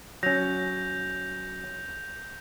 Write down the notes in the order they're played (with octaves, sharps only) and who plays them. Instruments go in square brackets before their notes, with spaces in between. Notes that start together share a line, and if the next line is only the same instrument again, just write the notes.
[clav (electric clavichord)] F#3 C#4 [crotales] G6 F7 [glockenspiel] A#6